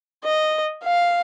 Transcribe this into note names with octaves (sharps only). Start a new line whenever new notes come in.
D#5
F5